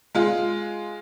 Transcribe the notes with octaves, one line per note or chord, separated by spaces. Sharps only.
G#3 F4